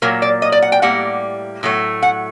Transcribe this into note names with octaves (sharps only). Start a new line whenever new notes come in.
A#2 F#3 A#3 A#4
D5
D#5
D5
F#5
G5
A2 G3 A#3 F#5
A2 F#3 A3
F#5